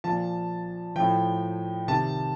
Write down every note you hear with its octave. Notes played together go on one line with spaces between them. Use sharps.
A#2 F3 A5
A2 F3 G5
C3 D#3 A5